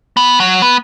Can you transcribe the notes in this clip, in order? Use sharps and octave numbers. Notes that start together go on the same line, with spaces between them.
B3
F#3
B3